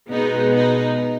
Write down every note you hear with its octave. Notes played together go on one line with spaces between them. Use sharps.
B2 G#3 B3 D#4
D#4